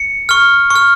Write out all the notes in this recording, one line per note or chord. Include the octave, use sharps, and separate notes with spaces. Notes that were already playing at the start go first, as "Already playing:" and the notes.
Already playing: C#7
C#6 F6
C#6
F6